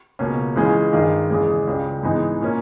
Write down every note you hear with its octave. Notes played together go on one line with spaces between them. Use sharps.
C#2 B2 A#3 C#4
C#2 C#3 E3 G#3 C#4
G2 D#3 G#3 D#4 G#4
E2 C#3 G#3
C#2 C#3 G3
G#2 E3 G#3 B3 D#4
A#2 A#3 C#4